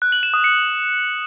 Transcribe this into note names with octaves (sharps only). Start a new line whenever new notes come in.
F#6
F#7
E7
D#6
C#7